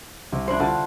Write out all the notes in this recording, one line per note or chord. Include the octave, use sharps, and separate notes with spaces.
C2
D4 E4 C5
D3 F4 A5 B5